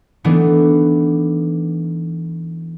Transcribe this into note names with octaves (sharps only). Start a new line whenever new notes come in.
E3 A3 B3 D4 D#4